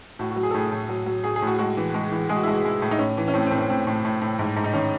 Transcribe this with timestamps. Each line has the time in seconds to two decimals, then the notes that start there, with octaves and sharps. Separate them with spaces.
0.19 A2 F#4
0.31 F#4
0.36 F#3
0.43 G#4
0.51 A4
0.54 A2 G#4
0.72 A2
0.89 F#3
1.06 F#3
1.24 F#3 G#4
1.36 G#4
1.42 A2 F#4
1.59 G#3 F#4
1.77 E3
1.94 G#3
2.11 E3
2.29 G#3 G#4
2.36 F#4
2.43 E4
2.47 G#3 F#4
2.65 G#3
2.82 A2
2.91 D#4
2.99 A2 C#4
3.17 E3
3.28 C#4
3.34 A2 C4
3.46 C4
3.51 A2
3.57 C#4
3.70 A2 C4
3.87 A2
4.05 A2
4.22 A2
4.39 G#2
4.56 G#2
4.64 D#4
4.74 D#3 C#4